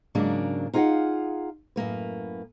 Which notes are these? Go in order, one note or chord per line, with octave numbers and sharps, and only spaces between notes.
G#2 C#3 F#3 A#3 D4
D#4 F4 G#4 D#5 F5 F#5
F#2 A2 A#3 B4